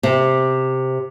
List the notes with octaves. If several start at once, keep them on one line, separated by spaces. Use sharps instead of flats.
C3 C4